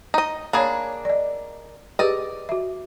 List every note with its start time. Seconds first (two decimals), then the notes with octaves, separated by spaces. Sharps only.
0.14 D#4 D#5
0.53 A#3 D4 G#4 C#5 B5
1.05 D5 D#5
1.99 G4 G#4 B4 D5 D#5
2.49 F#4 E5